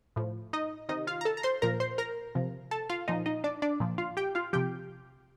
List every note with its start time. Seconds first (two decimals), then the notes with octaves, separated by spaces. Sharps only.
0.16 A2 F3
0.53 D#4 D#5
0.89 C3 D#3 D#4 D#5
1.07 F4 F5
1.21 A#5
1.25 A4 A5
1.37 A#5
1.43 C5 C6
1.62 A#2 F3 A#4 A#5
1.80 C5 C6
1.98 A#4 A#5
2.35 C3 F3
2.71 A4 A5
2.89 F4 F5
3.08 A#2 F3 D#4 D#5
3.26 D#4 D#5
3.44 D4 D5
3.62 D4 D5
3.80 A#2 F3
3.98 F4 F5
4.17 G4 G5
4.35 F4 F5
4.53 C3 F3 G4 G5